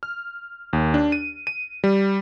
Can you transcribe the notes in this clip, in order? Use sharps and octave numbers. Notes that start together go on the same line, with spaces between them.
F6
D#2
D4
D#7
D#7
G3